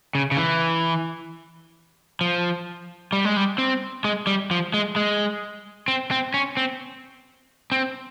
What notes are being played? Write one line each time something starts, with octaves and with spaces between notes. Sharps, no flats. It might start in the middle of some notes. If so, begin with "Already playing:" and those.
C#3
C#3
E3
F3
G3
G#3
G3
C4
G#3
G3
F3
G#3
G#3
C4
C4
C#4
C4
C4